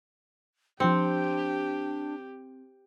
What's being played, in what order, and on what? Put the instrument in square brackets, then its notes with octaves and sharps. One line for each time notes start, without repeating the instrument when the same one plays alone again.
[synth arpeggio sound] F3 C6 C#7 [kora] C4 [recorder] D4 [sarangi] G4